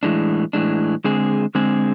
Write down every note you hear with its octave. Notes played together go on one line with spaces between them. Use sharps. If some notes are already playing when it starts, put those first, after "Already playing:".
A2 E3 G#3 D4
A2 E3 G#3 D4
D3 G#3 C4 G#4
D3 G#3 C4 G#4